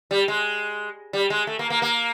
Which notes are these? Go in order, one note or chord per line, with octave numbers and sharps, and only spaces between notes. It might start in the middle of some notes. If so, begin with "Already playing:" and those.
G3
G#3
G3
G#3
A3
A#3
A#3
A#3